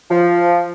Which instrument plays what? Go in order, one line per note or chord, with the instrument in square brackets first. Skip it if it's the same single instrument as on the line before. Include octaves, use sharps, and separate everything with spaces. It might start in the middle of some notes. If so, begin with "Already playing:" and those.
[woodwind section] F3